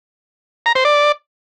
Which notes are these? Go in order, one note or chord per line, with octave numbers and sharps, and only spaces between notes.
A#5
C5
D5